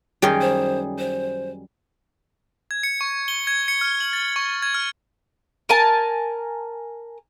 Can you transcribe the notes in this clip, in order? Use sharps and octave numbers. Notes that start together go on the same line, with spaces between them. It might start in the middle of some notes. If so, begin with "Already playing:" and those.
F#2 D#3 G3 C#4 G#4 G5
C5
C5
G#6
C#7
C#6
G7
G#6
C#7
F6
F#7
A6
C#6
G#6
F6
A#4 G#5 A5